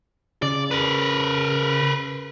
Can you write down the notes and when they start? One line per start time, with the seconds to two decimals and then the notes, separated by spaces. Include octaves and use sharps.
0.42 C#3 D5
0.71 A#4 B4